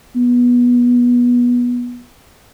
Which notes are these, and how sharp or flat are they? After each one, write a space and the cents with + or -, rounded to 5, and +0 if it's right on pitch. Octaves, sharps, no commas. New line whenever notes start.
B3 -20